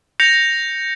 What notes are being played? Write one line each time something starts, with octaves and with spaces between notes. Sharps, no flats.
G6 A#6 C#7 F7